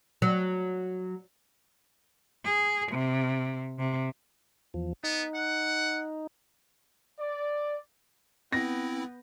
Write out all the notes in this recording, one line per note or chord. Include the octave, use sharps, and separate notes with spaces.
F#3
G#4
C3
C3
E2 F3
B3 D#4
F#5
D5
B3 C4 E4 A#6